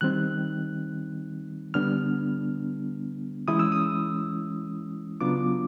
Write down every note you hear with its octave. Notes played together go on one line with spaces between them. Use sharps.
D#3 G3 C4 D#4 F#6
D3 G3 B3 D4 F6
E3 G#3 C#4 E4 D#6
E6
D#6
C#3 F#3 B3 D4 F4 D6